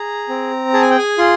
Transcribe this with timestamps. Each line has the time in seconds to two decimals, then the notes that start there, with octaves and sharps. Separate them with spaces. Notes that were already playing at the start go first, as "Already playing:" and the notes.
Already playing: G#4 A#5
0.29 C4
0.74 G#4 A5
0.81 G#5
0.90 G5
0.98 G#5
1.18 F4 C6